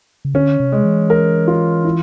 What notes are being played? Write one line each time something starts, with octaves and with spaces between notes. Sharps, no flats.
C#3
D3 C#4
C3
G#3
E3
A#4
F4
E4